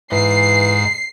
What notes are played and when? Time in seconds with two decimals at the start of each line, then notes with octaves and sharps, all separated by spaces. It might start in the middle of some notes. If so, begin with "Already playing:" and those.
0.12 G#2 E3 C7